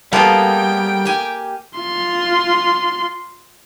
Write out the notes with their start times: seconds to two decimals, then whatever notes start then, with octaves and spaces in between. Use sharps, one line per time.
0.13 F3 G3 A#3 B3 G#4 A4 G5
1.05 G4 G#5
1.79 F4 C6